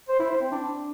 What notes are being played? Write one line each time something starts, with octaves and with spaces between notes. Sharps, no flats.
C5
E4
C5
C4
D4